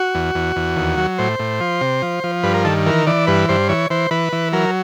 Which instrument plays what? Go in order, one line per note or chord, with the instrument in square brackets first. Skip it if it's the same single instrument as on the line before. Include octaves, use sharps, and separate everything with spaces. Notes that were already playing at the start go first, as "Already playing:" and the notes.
Already playing: [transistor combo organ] F#4
E2
E2
E2
D#2
F#3
A2 C5
A2
F3
C3
F3
F3
G2 B4
A#4
D#3 A4
E3 A#4
E3 D5
G2 B4
G2 C5
E3 C#5
E3 C5
E3 B4
E3
F#3 A#4